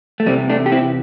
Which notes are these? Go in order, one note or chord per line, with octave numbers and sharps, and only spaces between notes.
A3
E2 C3 E3 G3 C4
A3 D4
G4
C4 E4